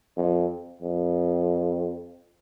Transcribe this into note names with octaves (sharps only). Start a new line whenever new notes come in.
F2
F2